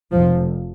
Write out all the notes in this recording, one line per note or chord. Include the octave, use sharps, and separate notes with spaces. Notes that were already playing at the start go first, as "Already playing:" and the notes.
F1 F2 C3 F3